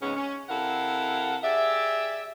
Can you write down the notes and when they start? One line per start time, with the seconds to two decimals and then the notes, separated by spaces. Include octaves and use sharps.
0.02 G#2 C#3 G#3 B3 C#4
0.16 C#4
0.49 C3 E4 A4 A#4 F5 F#5
1.44 G4 G#4 D5 E5